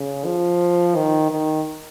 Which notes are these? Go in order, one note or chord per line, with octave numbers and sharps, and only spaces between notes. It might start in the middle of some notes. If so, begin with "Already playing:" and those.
Already playing: C#3
F3
D#3
D#3